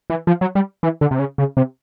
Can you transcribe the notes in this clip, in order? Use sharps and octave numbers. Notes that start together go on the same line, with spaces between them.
E3
F3
F#3
G3
E3
D3
C3
C#3
C#3
C3